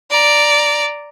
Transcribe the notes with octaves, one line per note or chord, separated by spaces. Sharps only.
D5 A#5